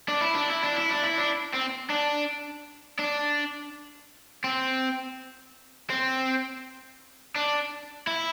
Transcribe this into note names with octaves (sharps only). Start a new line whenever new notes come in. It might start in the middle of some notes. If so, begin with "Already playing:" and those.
D4
E4
D4
E4
D4
E4
D4
E4
D4
C4
D4
D4
C4
C4
D4
E4